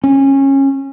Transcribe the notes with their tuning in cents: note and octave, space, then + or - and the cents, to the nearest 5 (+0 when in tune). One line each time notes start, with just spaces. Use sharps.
C#4 -20